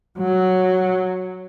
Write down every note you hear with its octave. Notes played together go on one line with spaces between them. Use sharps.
F#3